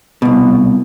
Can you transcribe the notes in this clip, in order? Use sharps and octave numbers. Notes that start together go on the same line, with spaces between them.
C2 B2